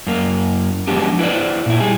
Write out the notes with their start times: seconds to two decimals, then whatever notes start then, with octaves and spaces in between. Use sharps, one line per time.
0.07 F#2 A#3
0.88 F3 F#3 G#3 B3 D4 G4
1.19 E4 B4 C5 D5
1.66 A#2 E4
1.80 G3 G#4